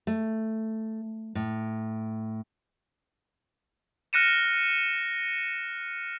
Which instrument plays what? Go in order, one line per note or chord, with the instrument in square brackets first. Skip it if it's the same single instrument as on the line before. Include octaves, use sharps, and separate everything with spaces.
[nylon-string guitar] A3
A2
[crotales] F6 F#6 A#6 C#7 D#7 E7